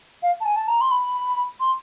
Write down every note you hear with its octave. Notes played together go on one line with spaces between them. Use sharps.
F5
A5
G#5
A5
A#5
C6
B5
C6